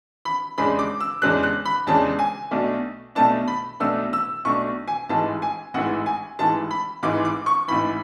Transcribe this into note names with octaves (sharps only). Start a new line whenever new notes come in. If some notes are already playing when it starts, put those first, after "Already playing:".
B5
E2 C#3 G#3 D4 B5
D6
E6
E2 C#3 G#3 D4 F#6
F#6
B5
E2 C#3 G#3 D4 A5
G#5
B1 B2 A3 D4
B1 B2 A3 D4 A5
B5
B1 B2 A3 D4 E6
E6
B1 B2 A3 D4 C#6
G#5
A1 G#2 E3 G#3 A5
G#5
A1 G#2 E3 G#3 F#5
G#5
A1 G#2 E3 G#3 A5
B5
A1 G#2 E3 G#3 D6
D6
C#6
A1 G#2 E3 B5